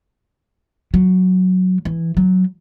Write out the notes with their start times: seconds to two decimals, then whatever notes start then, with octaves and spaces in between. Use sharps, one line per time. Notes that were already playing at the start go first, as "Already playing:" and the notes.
0.94 F#3
1.85 E3
2.17 F#3